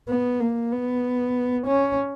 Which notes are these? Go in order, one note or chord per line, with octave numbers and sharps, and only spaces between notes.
B3
A#3
B3
C#4